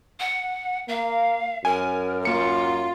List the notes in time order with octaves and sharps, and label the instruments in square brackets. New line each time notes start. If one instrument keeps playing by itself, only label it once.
[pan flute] F#5
[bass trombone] A#3 [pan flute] F5
[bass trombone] F#2 [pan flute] A#4 [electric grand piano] G#5
[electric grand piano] A#3 C#7 [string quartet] F4